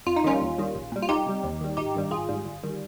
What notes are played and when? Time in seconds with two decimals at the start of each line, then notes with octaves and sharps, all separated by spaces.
0.06 F2 F4
0.16 D#4
0.24 D#3 G3 C#4 F4
0.41 D#2
0.58 D#3 G3
0.75 A#1
0.92 A#2 G3
1.02 F4
1.09 C2 D#4 G4
1.26 C3 G3
1.44 D#2
1.61 D#3 G3
1.77 G#1 D#4 G4
1.94 G2 D#3 G3
2.11 G#1 F4 G#4
2.29 G#2 G3
2.45 G1
2.63 D#3 G3